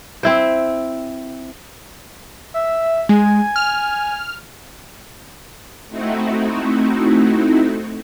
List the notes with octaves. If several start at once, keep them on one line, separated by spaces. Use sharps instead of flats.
C4 E4 C5
E5
G#3 G#5
F6
A3 C4 D#4 E4 F#4